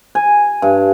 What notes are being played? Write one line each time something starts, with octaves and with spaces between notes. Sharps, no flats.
G#5
G2